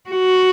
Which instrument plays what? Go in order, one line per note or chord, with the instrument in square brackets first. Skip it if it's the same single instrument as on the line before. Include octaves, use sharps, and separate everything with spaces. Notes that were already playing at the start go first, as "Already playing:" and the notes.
[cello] F#4